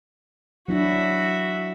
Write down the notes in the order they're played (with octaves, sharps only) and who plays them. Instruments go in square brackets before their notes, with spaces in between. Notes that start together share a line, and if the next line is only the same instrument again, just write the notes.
[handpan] F#3 D4 E4 [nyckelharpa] F#4 E5